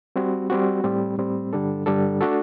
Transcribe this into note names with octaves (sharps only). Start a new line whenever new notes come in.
G3 C4 F#4
G3 C4 F#4
A2 G3 C4
A2 G3 C4
G2 D3 G3 D4 A4
G2 D3 G3 D4 A4
A3 D4 F#4 A4